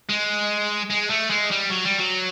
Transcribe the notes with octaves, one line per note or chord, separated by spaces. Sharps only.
G#3
G#3
A3
G#3
G3
F#3
G3
F#3